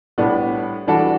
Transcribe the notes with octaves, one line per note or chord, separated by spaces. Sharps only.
A2 G3 B3 D4
E3 G3 D4 F#4 A4